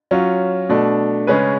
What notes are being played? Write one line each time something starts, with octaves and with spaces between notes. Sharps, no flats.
F#3 C#4 F4
B2 A3 D4
C#3 G#3 C#4 G#4 B4